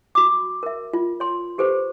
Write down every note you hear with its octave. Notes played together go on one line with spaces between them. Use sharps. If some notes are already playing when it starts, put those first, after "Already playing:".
F#4 D6
A#4 E5
F4
C#5 C6
G4 A4 B4 C5